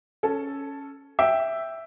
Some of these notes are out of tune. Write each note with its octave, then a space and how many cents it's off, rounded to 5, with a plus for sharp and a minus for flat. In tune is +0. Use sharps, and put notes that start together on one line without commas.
C#4 +0 A4 +0
E5 +0 G5 +0